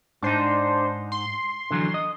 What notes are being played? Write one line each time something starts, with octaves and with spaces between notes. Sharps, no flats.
G#2 D4 D#4 C5
C6
D3 E3 F#3
D#5